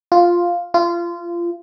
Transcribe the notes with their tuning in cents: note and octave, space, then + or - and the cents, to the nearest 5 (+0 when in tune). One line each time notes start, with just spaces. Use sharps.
F4 +0
F4 -25